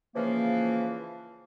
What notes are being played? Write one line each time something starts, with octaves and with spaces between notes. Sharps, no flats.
C#3 E3 F3 A#3